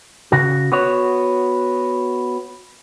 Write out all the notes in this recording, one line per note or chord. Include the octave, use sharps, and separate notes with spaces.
C#3 F#4
B3 F#4 C#5